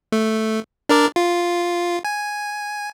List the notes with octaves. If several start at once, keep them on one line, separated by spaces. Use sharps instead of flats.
A3
D4 A#4 D5
F4
G#5